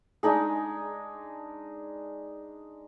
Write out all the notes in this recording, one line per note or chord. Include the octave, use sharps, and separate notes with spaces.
G#3 D4 D#4 G#4